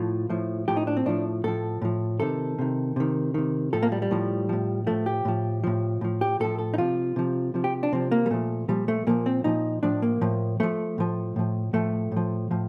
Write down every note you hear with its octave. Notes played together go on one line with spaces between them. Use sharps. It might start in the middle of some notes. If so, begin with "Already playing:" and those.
Already playing: A2 F3 F4
A2 F3
A2 F3 G4
D#4
D4
C4
A2 F3 D4
A2 F3 A4
A2 F3
C3 D#3 A4
C3 D#3
C3 D#3
C3 D#3
A2 F3 A4
A#3
G3
G3
A2 F3
A2 F3
A2 F3 A3
G4
A2 F3
A2 F3
A2 F3
G4
A2 F3 A4
A4
D#4
C3 F3 F4
C3 F3
C3 F3
G4
D4
C3 F3 C4
A#3
G3
A#2 F3 A3
A#2 F3 G3
A3
A#2 F3 A#3
C4
A#2 F3 D#4
A2 F3 D4
A#3
A2 F3
A2 F3 A3
A2 F3
A2 F3
A2 F3 A3
A2 F3
A2 F3